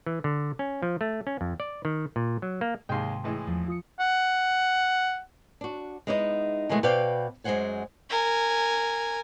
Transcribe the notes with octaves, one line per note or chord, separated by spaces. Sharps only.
E3
D3
C#4
F3
A3
C#4
F2
D5
D#3
A#2
F#3
A#3
D#2 G#2 C3 G#3 G5 C6
A2 E3 G#3
E2 F3
F4 D#6 C#7
F#5
D4 F#4
G#3 B3 D#4 E4 C5 D#5
B2 D#3 E3 G#3 A3
B2 B4 C5 D5 F5 G5
F#2 G#3 F4 C5 F#5 G#5
A#4 G#5